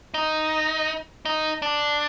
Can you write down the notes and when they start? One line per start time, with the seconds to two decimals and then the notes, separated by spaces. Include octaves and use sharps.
0.14 D#4
1.25 D#4
1.62 D4